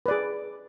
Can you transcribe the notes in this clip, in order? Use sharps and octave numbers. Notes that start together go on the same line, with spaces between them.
G#4 B4 D5